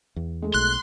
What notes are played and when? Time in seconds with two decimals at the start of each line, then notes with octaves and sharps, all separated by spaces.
0.16 E2
0.42 G#3 A3
0.54 B1 C6 F#6